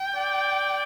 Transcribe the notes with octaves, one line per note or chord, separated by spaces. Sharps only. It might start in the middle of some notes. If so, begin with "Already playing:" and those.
Already playing: G5
D5